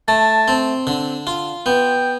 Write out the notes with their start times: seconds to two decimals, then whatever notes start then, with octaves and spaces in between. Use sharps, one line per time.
0.08 A3 A5
0.48 C4
0.87 D3
1.27 F4
1.66 B3 G5